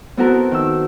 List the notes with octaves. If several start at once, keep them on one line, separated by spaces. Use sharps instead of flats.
B3 C4 E4 F#4 A4 A#4
D#3 E6